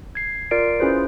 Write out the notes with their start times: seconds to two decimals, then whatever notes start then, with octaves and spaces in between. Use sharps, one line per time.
0.15 G#6 C7
0.51 F4 A#4 D5 C7 D7
0.80 C#4 E4 F4 G#4 B4 C5